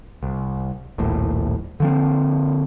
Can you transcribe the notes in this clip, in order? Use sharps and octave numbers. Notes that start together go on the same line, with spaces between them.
C2
D#1 A#1 A2
D3 F3 C4